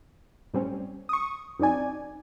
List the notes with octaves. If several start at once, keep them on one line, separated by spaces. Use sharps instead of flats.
A2 G3 C4 C#4
C#6 D#6
F#2 C4 D#4 D5 G#5